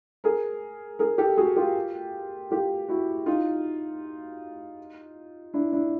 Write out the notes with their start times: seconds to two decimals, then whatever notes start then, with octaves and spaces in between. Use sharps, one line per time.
0.24 G#4 A#4
0.99 G#4 A#4
1.18 G4 A4
1.37 F#4 G#4
1.56 F4 G4
2.51 F4 G4
2.89 E4 F#4
3.26 D#4 F4
5.54 D4 E4
5.72 D4 E4